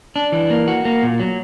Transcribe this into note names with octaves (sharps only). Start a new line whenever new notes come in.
D4
E3
A#3
F#4
A#3
A#2
F#3